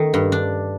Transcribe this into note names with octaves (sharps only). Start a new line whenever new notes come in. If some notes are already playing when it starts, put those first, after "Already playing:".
Already playing: D#3 A3
G2
D4